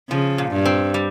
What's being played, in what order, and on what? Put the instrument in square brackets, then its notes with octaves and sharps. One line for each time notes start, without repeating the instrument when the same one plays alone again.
[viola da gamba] C#3 [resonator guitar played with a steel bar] F3
[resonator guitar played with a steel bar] A#2
[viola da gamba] G2
[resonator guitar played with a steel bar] C4
G3